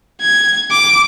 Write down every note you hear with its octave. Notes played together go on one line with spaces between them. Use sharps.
G#6
D6